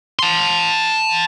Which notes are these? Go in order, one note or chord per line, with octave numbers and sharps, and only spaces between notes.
A5 C6